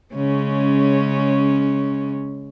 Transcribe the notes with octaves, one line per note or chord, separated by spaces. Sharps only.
C#3 G#3 C#4